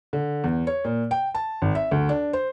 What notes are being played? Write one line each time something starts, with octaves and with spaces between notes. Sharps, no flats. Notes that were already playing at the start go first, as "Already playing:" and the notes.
D3
E2
C#5
A#2
G5
A5
G#1
E5
D2
D4
C5